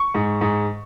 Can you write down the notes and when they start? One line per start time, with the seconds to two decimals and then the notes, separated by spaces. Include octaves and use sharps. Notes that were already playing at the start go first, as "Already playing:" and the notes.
Already playing: C#6
0.14 G#2
0.41 G#2